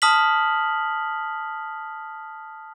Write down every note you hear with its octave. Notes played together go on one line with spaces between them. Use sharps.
A5 D#6 F6 B6 F#7